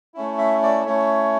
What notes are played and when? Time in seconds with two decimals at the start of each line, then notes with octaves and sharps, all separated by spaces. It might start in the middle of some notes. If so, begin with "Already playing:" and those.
0.14 A3 C#4 E4
0.38 E5
0.63 D5
0.86 A3 C#4 E4 C#5